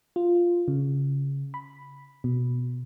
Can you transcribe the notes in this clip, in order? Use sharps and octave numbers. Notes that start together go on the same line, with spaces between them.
F4
C#3
B5
B2